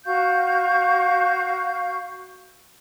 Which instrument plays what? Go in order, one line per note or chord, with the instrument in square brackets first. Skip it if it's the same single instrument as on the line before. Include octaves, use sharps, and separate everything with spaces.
[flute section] F#4 F5 C#6 G6